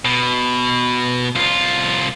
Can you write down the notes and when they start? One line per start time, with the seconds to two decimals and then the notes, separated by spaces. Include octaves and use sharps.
0.05 B2
1.35 C2 F4